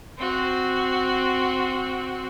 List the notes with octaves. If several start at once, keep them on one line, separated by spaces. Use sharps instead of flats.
C4 F#4